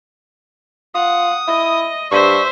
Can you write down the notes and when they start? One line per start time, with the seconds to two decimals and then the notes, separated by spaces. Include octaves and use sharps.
0.95 F4 F#5 D#6
1.48 E4 D#5
2.11 G2 C5 D5 E5 C#6